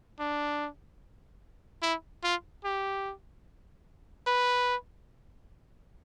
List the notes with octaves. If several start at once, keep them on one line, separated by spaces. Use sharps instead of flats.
D4
E4
F4
G4
B4